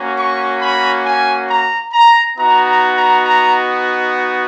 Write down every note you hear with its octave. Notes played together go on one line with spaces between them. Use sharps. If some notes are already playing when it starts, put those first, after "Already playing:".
Already playing: A#3 C#4 F#4
C#6
B5
G#5
A#5
A#5
B3 D#4 F#4 A#5
A#5
A#5
A#5